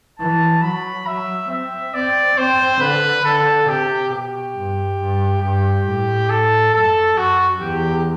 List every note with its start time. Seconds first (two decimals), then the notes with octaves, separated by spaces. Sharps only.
0.19 E3 A5
0.62 F#3 B5
1.06 F#3 E5
1.50 C4 E5
1.94 C4 D5
2.37 C4 C5
2.80 D3 B4
3.25 D3 A4
3.68 C3 G4
4.11 B2 G4
4.55 G2
4.99 G2
5.42 G2 G4
5.86 A2
6.29 A4
6.73 F#2 A4
7.17 F#2 F#4
7.60 E2 G4